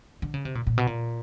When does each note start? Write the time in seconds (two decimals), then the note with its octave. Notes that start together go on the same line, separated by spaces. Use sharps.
0.22 D3
0.34 C#3
0.45 C3
0.55 A#2
0.67 A#2
0.78 B2
0.87 A#2